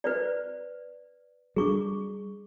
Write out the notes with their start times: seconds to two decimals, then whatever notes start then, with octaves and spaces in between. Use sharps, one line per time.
0.04 B4 C5 D5
1.56 G3 C#4 D4 G#4 C#6 D6